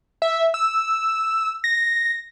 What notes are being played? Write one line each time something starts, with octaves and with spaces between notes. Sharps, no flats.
E5
E6
A#6